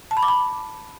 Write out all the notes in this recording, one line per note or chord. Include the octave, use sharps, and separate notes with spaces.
A5
B5
D6
B5